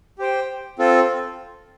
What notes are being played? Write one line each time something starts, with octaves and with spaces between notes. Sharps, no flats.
G4 C5 G5
C4 F4 A4